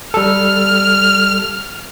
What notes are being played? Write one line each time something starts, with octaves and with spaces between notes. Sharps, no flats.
G3 A4 F6